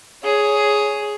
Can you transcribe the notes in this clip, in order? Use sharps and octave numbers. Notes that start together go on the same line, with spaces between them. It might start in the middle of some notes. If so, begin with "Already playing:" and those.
G#4 C#5